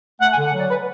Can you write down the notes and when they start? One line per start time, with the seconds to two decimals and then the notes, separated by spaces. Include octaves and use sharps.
0.21 A3 F#5
0.33 G#5
0.38 D3
0.45 F#5
0.54 F#3 D5
0.70 B4